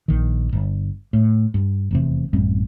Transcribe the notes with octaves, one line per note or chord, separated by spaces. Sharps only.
A#1 D#3
G1
A2
G2
F1 E2 C3
A1 F#2 G3 C4